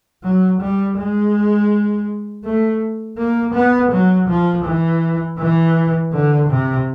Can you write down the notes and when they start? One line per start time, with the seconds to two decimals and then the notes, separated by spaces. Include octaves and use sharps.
0.23 F#3
0.61 G3
0.98 G#3
2.44 A3
3.18 A#3
3.54 B3
3.92 F#3
4.28 F3
4.65 E3
5.38 E3
6.12 D3
6.49 C3